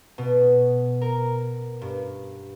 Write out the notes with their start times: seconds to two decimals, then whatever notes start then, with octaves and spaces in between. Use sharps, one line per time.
0.18 B2
1.01 A#4
1.82 G2